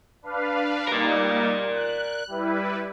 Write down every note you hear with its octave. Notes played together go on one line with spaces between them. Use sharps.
D4 B4 F5
G3 A#3 D#4 A#4 D5
F#6
G3 E4 B4